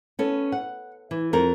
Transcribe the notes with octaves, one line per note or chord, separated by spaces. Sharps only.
B3 C#4 A4
F#5
E3
F2 A#4